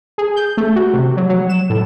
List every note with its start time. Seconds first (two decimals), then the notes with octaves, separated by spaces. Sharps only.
0.18 G#4
0.36 G6
0.57 A3
0.76 F#4
0.94 C3
1.17 F#3
1.29 F#3
1.49 E7
1.70 A2